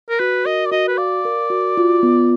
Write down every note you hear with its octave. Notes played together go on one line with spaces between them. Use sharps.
A#4
F#4 B4
A#4 D#5
D5
F#4 D#5
B4
D5 F5
A#4
F#4
F4
B3